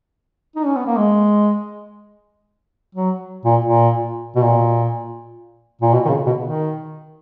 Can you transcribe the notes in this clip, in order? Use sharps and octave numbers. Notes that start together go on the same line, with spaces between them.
D#4
C#4
B3
A#3
G#3
F#3
A#2
A#2
B2
A#2
A#2
B2
D#3
C#3
B2
D#3